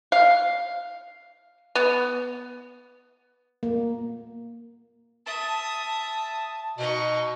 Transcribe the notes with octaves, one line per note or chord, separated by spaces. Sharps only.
F5
B3
A#3
E5 A5 D#6
B2 D#4 C#6